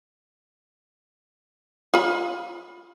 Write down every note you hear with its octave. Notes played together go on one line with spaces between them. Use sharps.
F4 B5